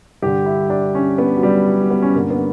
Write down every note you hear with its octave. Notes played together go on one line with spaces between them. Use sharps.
G2 D3 G4
E4
D4
C#4
B3
F#3
G3
F#3
F#3
B3
C#4
G2 D3 A#3
B3